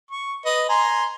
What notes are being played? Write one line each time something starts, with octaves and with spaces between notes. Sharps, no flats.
C#6
B4 D#5
G#5 A#5 C6